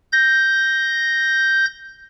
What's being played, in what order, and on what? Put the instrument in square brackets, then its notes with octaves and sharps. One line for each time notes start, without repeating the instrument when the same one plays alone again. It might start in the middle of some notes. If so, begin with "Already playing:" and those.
[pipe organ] G6 A#6